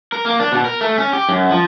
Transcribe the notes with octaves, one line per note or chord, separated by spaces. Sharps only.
A#4
A#3
D4
B2
A#4
A3
C#4
G4
F#2
F3